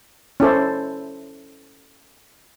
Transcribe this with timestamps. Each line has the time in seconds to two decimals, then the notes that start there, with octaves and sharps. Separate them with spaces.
0.40 C#4 E4 A4 C5